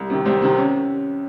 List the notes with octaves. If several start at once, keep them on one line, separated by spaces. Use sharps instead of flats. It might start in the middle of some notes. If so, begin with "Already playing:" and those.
Already playing: C2
C3 D#3
C2 C4
C3 D#3
C#4